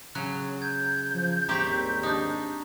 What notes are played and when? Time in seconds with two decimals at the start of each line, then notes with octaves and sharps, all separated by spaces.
0.15 C#3 F#3 F#6
0.62 G6 G#6
1.14 F3
1.49 D#2 G#2 G3 C4 G4 A#5 C#6 B6
2.03 D4 D#4